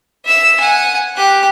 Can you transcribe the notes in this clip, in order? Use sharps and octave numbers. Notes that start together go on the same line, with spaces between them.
E5 E6
F#5 G#5
G4 F#6